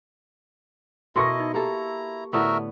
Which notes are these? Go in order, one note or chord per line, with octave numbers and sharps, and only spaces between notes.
B2 E4 A4 A#4 D#5 C6 C#6 A#6
D#4
A#3 E4 G4 A4 A#5
A2 D3 B3 F#4 A#4 E5